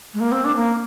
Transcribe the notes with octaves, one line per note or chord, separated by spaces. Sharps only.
G#3
A#3
C4
D4
A#3